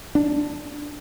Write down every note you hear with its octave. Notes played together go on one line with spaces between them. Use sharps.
D4